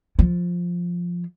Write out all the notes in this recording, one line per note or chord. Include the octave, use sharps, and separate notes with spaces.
F3